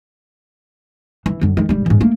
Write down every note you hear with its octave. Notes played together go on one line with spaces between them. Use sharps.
E3
F#2 D3
D#3 G#3
E1 G3
E2 G#2
A3 A#3